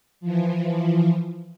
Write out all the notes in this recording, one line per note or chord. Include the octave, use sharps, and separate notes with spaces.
E3 F3